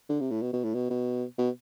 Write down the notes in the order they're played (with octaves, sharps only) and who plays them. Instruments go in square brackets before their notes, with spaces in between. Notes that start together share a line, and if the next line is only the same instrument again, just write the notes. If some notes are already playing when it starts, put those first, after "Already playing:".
[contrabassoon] D3
C3
A2
B2
B2
A2
B2
B2
B2